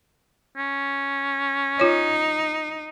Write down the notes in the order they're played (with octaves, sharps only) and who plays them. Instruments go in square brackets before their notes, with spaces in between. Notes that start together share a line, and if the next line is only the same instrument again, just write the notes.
[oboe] C#4
[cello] D#4 [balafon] F4 C#5